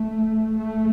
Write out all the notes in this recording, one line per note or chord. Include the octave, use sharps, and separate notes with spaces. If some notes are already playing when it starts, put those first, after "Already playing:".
Already playing: A3
A3